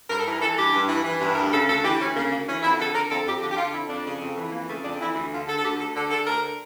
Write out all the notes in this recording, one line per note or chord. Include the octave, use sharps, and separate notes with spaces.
G2 A#4
A4
E3
A#4
E3 A4
G2 G4
G2
E3
E3
G2
D2 A#4
C#3 A4
D2 A4
E3 G4
D2 C#4
C#3 A#3
D2 A#3
E3 C#4
F2 E4
D3 A4
D3 A#4
F2 A4
F2 G4
D3 G4
G4
D3 F4
F2 E4
F2 D4
C#3
F2
E3
F2 A#3
C#3 A3
F2 D4
E3 E4
D2 E4
D3 F4
D3 A4
A4
D2 G4
D2 A4
D3 A4
D3 A4
D2 A#4